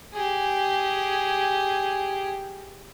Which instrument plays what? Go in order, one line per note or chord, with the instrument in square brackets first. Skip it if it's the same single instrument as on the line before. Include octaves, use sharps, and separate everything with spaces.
[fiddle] G4 G#4